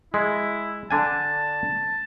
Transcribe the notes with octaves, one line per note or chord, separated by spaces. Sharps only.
G#3 E4
D3 D4 G#5 A5